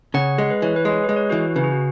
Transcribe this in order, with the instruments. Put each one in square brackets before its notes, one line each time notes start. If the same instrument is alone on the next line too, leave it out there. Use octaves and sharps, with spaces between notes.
[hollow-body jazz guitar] C#3 [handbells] C#5 F#5
[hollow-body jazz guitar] G#3
[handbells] B4
[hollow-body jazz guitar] E3 [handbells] C#5
[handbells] B4
[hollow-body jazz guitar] G#3
[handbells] C#5
B4
[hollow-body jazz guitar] G#3
[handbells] C#5
[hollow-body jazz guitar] E3 [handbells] F#4 B4
[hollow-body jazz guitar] C#3 [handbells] B4
[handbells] G#4
F#4